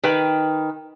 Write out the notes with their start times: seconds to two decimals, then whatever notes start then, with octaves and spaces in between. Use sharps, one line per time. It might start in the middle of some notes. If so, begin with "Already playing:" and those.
0.03 D#3 B4 G5